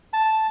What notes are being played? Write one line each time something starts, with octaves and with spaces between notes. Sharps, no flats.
A5